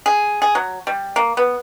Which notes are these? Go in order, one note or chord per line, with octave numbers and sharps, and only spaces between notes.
G#4
G#4
F#3
G3
A#3
B3